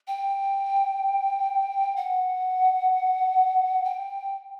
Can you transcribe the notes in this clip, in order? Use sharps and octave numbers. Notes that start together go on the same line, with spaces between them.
G5
F#5
G5